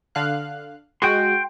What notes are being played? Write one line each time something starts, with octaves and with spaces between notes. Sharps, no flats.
D3 F5 F#6
G#3 F#4 G5 C6